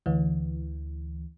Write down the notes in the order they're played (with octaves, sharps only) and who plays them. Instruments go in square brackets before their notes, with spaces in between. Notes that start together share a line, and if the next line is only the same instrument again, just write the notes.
[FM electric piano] D2 E3